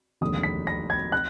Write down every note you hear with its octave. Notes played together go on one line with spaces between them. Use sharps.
F1 D#2 D3 G#3 D#6
B6
A#6
G#6
F#6